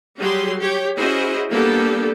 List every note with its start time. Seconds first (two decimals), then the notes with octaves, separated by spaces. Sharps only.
0.18 F#3 G3 G4 G#4 C6
0.59 G4 C#5
0.96 C#4 E4 F#4 G#4 C5 D#5
1.51 G3 A#3 B3 D4 G4 A4